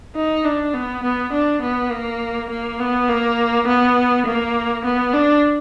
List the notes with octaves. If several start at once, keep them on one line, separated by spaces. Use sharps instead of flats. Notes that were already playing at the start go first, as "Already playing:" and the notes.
D#4
D4
B3
B3
D4
B3
A#3
A#3
B3
A#3
B3
A#3
B3
D4